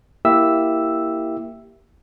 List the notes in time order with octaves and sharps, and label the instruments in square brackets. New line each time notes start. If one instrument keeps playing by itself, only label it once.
[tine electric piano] A#3 E4 G4 E5 E6